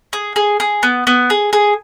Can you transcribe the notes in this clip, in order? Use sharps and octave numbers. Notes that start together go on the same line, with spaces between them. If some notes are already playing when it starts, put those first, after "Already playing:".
G#4
G#4
G#4
B3
B3
G#4
G#4